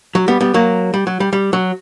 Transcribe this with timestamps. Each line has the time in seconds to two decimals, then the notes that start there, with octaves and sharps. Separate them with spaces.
0.15 F#3
0.28 G3 B3
0.41 G3 B3
0.54 F#3 A#3
0.94 G3
1.07 F#3
1.20 G3
1.33 G3
1.53 F#3